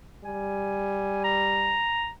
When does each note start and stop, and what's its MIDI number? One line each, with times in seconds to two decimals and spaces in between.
0.25 1.80 55
0.25 1.21 80
1.24 2.10 82